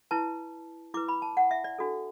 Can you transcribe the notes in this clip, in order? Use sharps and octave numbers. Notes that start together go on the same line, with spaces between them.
E4 B4 A5
E4 B4 D6
B5
A5
F#5
E5
D5
D4 F#4 A4